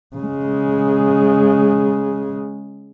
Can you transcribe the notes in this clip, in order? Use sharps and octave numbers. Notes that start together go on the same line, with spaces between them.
C#3 G#3